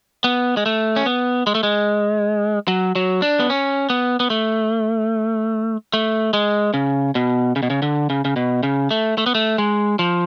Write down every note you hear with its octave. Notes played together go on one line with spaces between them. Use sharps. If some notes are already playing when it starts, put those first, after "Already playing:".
B3
G#3
A3
C#4
B3
G#3
A3
G#3
F#3
F#3
D4
B3
C#4
B3
B3
A3
A3
G#3
C#3
B2
C#3
B2
C#3
D3
C#3
C#3
B2
C#3
A3
A3
B3
A3
G#3
F3